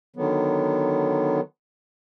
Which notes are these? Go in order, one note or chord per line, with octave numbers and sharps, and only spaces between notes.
D3 D#3 F#3 B3